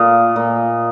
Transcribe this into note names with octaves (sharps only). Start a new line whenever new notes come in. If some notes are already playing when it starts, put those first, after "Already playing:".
Already playing: A#2 D#5 F5
A#2